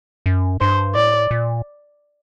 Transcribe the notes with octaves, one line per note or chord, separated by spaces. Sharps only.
F#2
G2 C5
A2 D5
A#2